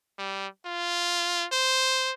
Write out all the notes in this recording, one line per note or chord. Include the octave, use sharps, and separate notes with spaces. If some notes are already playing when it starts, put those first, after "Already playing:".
G3
F4
C5